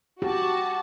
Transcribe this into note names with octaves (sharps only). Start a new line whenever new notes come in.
F#4 G4 A5